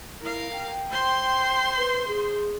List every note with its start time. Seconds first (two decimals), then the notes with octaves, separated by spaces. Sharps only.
0.22 E4 A#4 F5
0.52 G5
0.91 C5 C6
1.77 B4
2.08 G#4